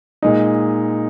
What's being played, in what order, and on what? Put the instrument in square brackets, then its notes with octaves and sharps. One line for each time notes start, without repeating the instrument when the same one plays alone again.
[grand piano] A#2 G#3 D#4